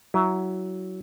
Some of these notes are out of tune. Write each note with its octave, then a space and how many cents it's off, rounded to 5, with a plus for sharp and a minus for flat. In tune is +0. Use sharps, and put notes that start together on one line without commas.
F#3 +15 E4 +0